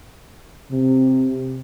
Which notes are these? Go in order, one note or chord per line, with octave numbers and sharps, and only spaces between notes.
C3